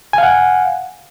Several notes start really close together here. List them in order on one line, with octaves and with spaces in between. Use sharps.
G#5 F5 F#5